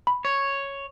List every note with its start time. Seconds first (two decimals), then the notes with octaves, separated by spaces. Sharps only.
0.07 B5
0.25 C#5